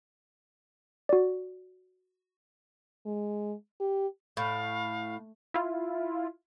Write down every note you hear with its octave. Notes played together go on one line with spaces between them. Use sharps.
F#4 D5
G#3
G4
A2 F5
E4 F4